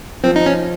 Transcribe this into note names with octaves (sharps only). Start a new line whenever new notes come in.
F3 C4
D#4
C#4